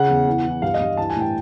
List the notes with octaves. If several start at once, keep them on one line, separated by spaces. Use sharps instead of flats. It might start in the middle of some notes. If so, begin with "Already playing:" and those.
Already playing: C#3 F#5
E2
E3
E3
G2 F5
D#5
G2
E3 A5
G#5
A2 G5